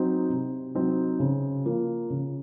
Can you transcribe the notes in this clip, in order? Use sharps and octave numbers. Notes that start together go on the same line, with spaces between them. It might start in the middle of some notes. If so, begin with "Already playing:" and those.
Already playing: F#3 C4 D#4
C3
F#3 C4 D#4
C#3
F3 A#3
C#3